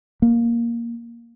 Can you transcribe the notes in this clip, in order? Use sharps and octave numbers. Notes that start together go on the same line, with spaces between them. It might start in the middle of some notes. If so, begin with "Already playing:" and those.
A#3